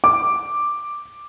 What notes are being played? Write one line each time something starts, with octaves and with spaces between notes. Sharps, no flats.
D6